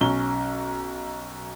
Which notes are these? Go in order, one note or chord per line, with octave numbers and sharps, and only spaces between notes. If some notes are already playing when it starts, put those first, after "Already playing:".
B1 C#4 G7